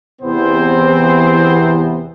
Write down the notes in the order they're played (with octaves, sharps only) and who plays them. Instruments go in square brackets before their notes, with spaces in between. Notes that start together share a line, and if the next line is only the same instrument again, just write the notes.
[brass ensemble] E2 C3 E3 B3 C4 C5